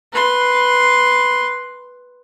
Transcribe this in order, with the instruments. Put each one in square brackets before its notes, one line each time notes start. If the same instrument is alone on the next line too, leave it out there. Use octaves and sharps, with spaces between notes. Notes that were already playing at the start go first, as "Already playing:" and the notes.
[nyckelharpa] B4 C6